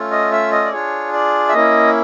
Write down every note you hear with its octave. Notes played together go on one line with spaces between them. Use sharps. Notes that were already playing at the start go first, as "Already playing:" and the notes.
Already playing: A3 C#4 F4
D#5
E5
D#5
D5
D4 F4 G#4 C#5
D5
E5
A#3 C#4 E4 D#5